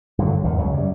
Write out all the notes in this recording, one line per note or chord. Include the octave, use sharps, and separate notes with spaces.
G2 D3 F#3
G#1 E2 D#3
C#2 C#3 F#3
F#2 G3